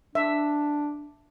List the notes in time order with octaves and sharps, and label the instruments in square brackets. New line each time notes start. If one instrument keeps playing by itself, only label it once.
[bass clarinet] D4 [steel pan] E5